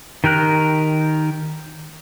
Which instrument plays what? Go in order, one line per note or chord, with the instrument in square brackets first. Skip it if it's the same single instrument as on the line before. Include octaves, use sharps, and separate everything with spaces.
[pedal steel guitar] D#3 G4 A#4 F#6